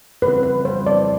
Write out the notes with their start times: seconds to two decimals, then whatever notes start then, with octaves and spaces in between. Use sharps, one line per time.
0.22 F2 C#3 E3 G3 C4 B4
0.43 B4
0.65 C5
0.87 D5